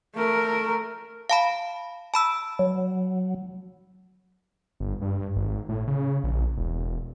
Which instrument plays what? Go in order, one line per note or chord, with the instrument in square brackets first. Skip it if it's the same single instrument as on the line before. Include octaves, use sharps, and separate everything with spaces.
[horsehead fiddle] A3 A#4
[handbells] F5 A5 B5
A5 B5 E6
[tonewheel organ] F#3
[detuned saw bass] G1
G2
G#1
A2
C#3
A#1
E1